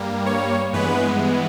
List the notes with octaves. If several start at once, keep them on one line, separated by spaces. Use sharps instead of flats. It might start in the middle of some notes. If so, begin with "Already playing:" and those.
Already playing: G2 G3 A#3
C#5
G2 E3 G#3 B3 B4